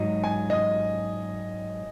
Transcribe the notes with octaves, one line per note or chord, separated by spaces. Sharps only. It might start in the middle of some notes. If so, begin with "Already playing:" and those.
Already playing: G#2 F#3 D#4 D#5
G#5
D#5